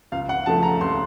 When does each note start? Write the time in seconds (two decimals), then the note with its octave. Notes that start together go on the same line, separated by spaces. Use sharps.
0.12 C#2 F5
0.29 F#5
0.46 C#3 F3 A3 A5
0.63 A#5
0.81 C#2 C6